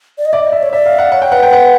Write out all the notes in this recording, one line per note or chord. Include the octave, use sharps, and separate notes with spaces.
D5
D#5
D5 E5
D#5
D5 E5
C#5
D5 E5
F5
F#5
C#5 F#5
G5
B4 F#5
G5
F#5